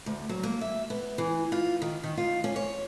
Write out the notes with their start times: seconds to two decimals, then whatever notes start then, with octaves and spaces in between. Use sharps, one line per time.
0.06 D2
0.29 F#3
0.43 A#3
0.61 E5
0.90 B3
1.18 E3
1.52 F4
1.82 D#3
2.04 D#3
2.17 F4
2.44 C#4
2.56 C#5